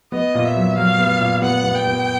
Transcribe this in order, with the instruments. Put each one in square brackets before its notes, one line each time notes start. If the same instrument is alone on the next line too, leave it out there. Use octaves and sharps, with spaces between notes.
[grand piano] B3 [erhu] D#5
[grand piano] A#2
[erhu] E5
[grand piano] F#3
[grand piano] F#3 [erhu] F5
[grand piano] B3
A#2
[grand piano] B3 [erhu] F#5
[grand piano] B3
[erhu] G5
[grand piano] B3